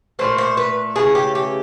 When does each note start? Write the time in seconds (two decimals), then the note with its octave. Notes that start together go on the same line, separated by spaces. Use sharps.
0.19 A#2 F#3 A3 C5
0.38 C5
0.57 B4
0.96 C#3 E3 A3 G#4
1.15 G4
1.35 G4